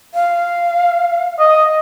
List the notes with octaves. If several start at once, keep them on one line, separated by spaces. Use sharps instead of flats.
F5
D#5